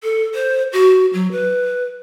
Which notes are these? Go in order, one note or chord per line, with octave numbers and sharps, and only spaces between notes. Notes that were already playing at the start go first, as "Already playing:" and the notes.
A4
C5
F#4
F#3
B4